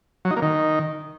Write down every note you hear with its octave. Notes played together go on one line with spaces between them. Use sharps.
F#3
D#4
A#3
D#3